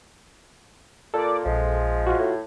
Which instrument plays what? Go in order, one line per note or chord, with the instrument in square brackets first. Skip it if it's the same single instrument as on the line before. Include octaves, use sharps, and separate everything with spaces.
[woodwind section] A#2 [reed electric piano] A4 [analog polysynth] D5 D6
[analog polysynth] A#1 [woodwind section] F3 G#3
[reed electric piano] F4 F#4
[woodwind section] A2